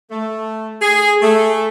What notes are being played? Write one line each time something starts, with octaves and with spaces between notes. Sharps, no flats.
A3
G#4
A3